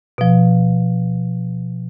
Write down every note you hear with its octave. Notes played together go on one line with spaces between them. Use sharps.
B2 F3